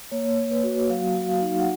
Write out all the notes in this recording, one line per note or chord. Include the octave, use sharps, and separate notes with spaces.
A#3 C#5
A#3
B4
F#4
F#3 F5
F#4
F5
D#4
F#5